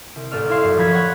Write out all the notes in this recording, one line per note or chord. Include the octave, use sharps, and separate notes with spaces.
C2 D7
A1 A4 D5 F6
E4 E5 F5 C6
F#2
F3 F5 B5 G#6 B6
C#5 F#5 G#6